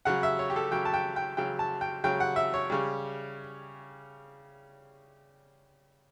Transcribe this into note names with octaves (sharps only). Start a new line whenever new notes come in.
C#3 F#3 F#5
E5
C#5
G4
A4
C#3 F#3 G5
A5
G5
G5
C#3 F#3 G5
A5
G5
C#3 F#3 G5
F#5
E5
C#5
C#3 G3